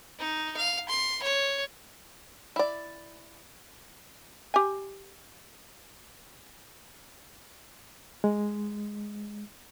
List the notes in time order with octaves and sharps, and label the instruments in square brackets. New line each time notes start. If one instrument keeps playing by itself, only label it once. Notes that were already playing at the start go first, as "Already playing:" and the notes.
[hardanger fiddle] D#4
F5
C6
C#5
[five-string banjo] E4 D5
[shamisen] G4 G#5
[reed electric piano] G#3